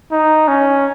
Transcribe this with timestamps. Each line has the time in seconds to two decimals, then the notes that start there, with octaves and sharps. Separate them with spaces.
0.12 D#4
0.48 C#4